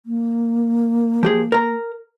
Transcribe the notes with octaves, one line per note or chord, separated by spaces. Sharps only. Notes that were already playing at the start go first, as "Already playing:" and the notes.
A#3
F3 G4 G#4
A#4 A#5